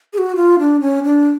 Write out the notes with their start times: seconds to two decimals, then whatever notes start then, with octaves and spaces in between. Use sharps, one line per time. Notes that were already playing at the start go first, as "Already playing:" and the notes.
0.13 G#4
0.18 F#4
0.36 F4
0.59 D4
0.81 C#4
1.04 D4